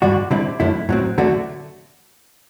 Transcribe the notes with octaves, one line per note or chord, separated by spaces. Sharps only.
G2 D3 G3 D4 F#4
D3 G3 C4 E4
F#2 D3 A3 E4
A2 F#3 C4
D3 F#3 A3 D4 F#4